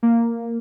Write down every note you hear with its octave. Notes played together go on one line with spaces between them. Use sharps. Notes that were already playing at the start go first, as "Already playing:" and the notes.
A#3